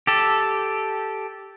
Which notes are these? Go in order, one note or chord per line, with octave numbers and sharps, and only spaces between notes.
G4 A4